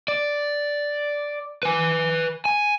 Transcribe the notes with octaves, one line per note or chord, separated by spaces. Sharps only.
D5
B4 G#5
G#5